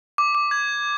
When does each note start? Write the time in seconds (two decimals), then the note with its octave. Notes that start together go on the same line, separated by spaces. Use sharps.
0.18 D6
0.35 D6
0.51 G#6